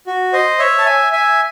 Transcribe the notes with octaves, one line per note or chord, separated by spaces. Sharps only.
F#4
C5 D#5
C#5 E5
A5
E5 G#5
E5 G#5